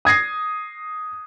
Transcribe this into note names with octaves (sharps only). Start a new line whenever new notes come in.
D#6 G#6 A#6 C7